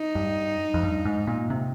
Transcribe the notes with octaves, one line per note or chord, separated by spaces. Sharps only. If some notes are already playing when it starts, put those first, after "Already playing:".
Already playing: D#4
G2
F2
G2
G#2
A#2
C3